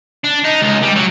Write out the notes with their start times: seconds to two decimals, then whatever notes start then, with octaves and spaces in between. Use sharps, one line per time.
0.25 D4
0.45 D#4
0.62 C#2
0.83 G3
0.96 F#3